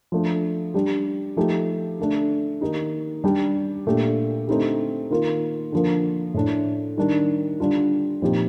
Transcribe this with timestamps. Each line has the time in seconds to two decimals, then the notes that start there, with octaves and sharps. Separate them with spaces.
0.12 F3 A3 D4
0.74 G3 D4 G4
1.37 F3 A3 D#4 G4
1.99 D3 A3 D4
2.61 D#3 A#3 D#4 G4
3.24 G3 D4 G4
3.86 A#2 A3 D4 G4
4.48 D3 A3 C4 D#4 G4
5.11 D#3 A#3 F4
5.72 D3 F3 A#3
6.34 A2 A3 D4
6.98 D#3 G3 D4 G4
7.60 D3 G3 D4 F4
8.22 A#2 F3 C4 D#4 G4